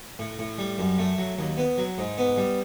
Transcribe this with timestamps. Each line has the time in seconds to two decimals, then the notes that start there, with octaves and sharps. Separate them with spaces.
0.19 A2
0.39 A2
0.58 G3
0.78 F#2
0.99 A3
1.18 F#3
1.39 D#2
1.58 B3
1.78 F#3
1.98 G#2
2.18 B3
2.38 G3